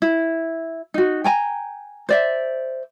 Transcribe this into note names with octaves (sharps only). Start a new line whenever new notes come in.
E4
D#4 F#4
G5 G#5 A#5
C5 D5 E5